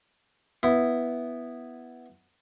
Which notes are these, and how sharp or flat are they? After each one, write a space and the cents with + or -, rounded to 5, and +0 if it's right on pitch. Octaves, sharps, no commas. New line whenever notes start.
B3 +0 E4 +0